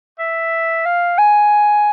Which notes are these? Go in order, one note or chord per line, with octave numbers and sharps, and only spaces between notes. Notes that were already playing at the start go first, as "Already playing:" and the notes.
E5
F5
G#5